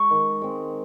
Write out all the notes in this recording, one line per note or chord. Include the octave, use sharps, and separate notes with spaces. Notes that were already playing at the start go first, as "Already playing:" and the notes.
Already playing: G#3 A#5 C#6
D#3
G#3 C4